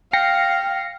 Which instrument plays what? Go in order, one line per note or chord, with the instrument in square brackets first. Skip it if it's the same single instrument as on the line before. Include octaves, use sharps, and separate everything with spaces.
[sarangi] F5 [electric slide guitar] G5 [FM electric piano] A#6 C7 C#7